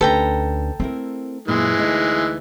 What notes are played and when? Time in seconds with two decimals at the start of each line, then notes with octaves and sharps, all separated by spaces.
0.01 D2 C#4 D4 A4 B4 G5 A#5
0.80 A3 C4 E4 A#4
1.48 F#2 A#2 E3 G#3
1.79 D2 D#4